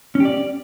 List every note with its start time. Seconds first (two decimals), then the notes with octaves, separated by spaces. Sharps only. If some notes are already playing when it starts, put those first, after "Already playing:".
0.15 C#4
0.20 G4
0.25 D5